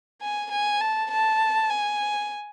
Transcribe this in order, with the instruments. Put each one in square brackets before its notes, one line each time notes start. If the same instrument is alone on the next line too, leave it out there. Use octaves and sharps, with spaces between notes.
[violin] G#5
G#5
A5
A5
G#5